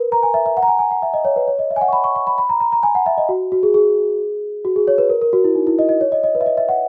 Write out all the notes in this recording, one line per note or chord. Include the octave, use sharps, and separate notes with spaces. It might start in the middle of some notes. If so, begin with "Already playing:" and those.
Already playing: A#4 B4
A#5
G#5
E5
E5
F#5
A#5
G#5
G#5
F#5
E5
D#5
C#5
B4
C#5
D#5
E5
G#5
F#5
C#6
B5
C#6
C#6
B5
B5
A#5
A#5
A#5
G#5
F#5
E5
D#5
F#4
F#4
G#4
G#4
F#4
G#4
C#5
B4
A#4
A#4
F#4
E4
D#4
E4
D#5
D#5
C#5
D#5
D#5
B4
E5
D#5
E5
F#5